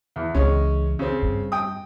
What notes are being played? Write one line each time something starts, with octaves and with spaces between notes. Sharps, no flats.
E2
C#2 E3 G#3 C#4
C#3 C4
G2
G5 D#6